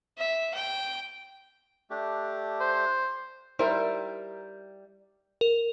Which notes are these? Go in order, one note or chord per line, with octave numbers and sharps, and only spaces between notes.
E5
G5
A3 D4 G4
C5
G3 D#4 E4 A#4 C5 E5
A#4